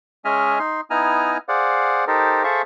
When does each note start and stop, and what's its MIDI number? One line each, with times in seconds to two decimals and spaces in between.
0.25 0.59 56
0.25 0.59 61
0.25 0.59 75
0.25 0.59 76
0.25 0.59 80
0.25 0.59 89
0.59 0.81 63
0.59 0.81 84
0.90 1.37 59
0.90 1.37 63
0.90 1.37 64
0.90 1.37 80
0.90 1.37 82
0.90 1.37 89
1.49 2.05 68
1.49 2.05 72
1.49 2.05 74
1.49 2.05 77
1.49 2.05 78
2.07 2.44 63
2.07 2.44 67
2.07 2.44 69
2.07 2.44 70
2.07 2.44 72
2.44 2.62 68
2.44 2.62 69
2.44 2.62 72
2.44 2.62 76
2.44 2.62 77
2.44 2.62 85